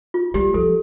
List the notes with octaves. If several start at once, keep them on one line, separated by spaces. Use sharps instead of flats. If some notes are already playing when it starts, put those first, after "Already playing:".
F4
G3 G4
F3 A4